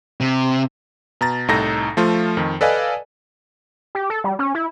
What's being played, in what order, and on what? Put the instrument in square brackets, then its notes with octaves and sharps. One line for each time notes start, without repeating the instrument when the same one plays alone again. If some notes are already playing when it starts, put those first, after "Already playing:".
[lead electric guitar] C3
[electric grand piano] B2 A#5 A6
C2 A2 D#4 A4 A#5 A#6
F3 A3 F4
F2 D#3
A4 B4 D5 D#5 F5 G#5
[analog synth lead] G4
A4
G3
C#4
E4